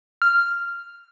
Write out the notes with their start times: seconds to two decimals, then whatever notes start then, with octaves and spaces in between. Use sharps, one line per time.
0.22 F6